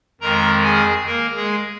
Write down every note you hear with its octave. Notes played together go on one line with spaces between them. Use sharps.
F2 D#3 G#3 A#4 A#5
G#4 G#5
A#3 A#4
G#3 G#4